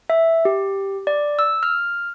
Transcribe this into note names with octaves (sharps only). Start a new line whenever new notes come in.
E5
G4
D5
E6
F6